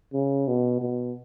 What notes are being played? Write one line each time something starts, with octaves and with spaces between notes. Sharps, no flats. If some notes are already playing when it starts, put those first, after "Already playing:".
C#3
B2
B2